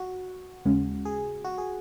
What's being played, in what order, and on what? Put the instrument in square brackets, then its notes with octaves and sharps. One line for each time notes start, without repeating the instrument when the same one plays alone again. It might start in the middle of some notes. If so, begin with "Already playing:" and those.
Already playing: [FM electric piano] F#4
[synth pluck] D#2 C#3 G#3 C#4
[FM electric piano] G#4
F#4
G#4